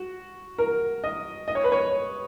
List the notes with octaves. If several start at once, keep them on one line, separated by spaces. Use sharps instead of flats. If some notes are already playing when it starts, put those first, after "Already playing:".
Already playing: F#4
A#4
D#5
D#5
C#5
B4
C#5